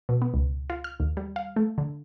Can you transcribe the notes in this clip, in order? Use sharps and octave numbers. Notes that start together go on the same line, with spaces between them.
B2
B3
C#2
F4
F6
D#2
G3
F5
A3
D3